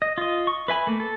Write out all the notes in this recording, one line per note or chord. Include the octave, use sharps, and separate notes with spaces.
D#5
F4 D#5
C#6
B4 E5 G#5 B5
A3 A#3
A4